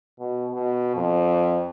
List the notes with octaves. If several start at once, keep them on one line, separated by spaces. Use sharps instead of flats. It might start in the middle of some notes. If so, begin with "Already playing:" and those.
B2
B2
F2